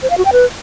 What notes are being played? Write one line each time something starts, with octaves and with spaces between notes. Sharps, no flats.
C5
F5
F#4
G5
B4